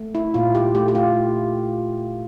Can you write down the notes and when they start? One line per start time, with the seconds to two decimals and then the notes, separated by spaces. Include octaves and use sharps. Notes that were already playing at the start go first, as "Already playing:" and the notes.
Already playing: A3
0.15 E4
0.34 A#2 F4
0.55 G4
0.75 A3 G4
0.88 G4
0.95 F4